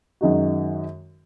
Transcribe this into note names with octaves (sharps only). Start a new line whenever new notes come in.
F#2 D#3 G#3 D#4 F#4